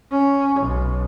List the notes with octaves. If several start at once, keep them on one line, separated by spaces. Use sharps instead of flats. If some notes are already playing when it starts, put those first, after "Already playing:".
C#4
B1